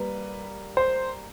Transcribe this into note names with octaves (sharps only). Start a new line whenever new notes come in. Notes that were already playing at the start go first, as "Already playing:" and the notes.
Already playing: G3 A#3 B4
C5